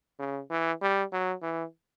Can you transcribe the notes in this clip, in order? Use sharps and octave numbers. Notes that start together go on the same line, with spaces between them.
C#3
E3
G3
F#3
E3